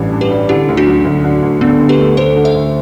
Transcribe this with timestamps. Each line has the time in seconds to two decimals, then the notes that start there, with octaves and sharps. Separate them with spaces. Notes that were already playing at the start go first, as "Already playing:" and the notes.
Already playing: A1 G2 E3 G3
0.12 G2
0.21 G4 B4
0.31 G3
0.49 D3 E4 G4
0.69 D2
0.77 D4 F#4
0.87 F#3
1.05 D2
1.24 D3
1.42 D2
1.61 D3 B3 D4
1.80 D2
1.89 G4 B4
1.99 A3
2.17 D2 A4 C5
2.36 D3
2.45 C5 E5
2.55 D2